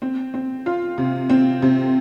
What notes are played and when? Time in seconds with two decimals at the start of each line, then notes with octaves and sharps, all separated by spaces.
0.02 C4
0.34 C4
0.66 F4
0.98 C3
1.30 C4
1.62 C3